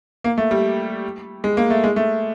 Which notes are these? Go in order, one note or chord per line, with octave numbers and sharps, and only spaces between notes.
A#3
A3
G3
G#3
A#3
A3
G#3
A3